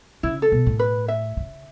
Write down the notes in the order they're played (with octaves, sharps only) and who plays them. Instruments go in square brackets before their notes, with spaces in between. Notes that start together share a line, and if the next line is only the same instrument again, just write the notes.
[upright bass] C#3 [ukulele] E4
[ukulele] A4
[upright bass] B2
A2
[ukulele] B4
E5
[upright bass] C#3